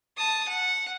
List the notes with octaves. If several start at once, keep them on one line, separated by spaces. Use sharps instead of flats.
A5 D#6
F#5